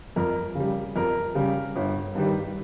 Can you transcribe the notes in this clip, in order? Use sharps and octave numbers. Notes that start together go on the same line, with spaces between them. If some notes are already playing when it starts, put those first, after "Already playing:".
F2 A#4
C#3 G3
F2 A#4
C#3 G3
G1
G2 D#3 G3